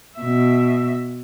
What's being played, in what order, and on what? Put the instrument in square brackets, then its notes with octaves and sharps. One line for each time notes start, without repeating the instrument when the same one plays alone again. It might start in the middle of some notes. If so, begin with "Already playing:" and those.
[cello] B2 E5